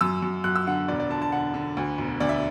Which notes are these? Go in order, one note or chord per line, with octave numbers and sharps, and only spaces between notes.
F#2 E6
F#2
F#2 F#6
E6
D3 F#5
E1 D5
D5
D3 A5
A5
D3 F#5
D3
D2
E1
D2 D5
E5